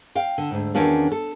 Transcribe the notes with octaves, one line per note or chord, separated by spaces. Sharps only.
F5 G5
D3
D2 G#2
E2 D#3 C#4 D4 F#4 F5
A4